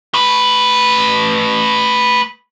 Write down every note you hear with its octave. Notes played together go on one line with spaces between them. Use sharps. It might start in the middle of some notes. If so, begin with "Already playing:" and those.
A3 B4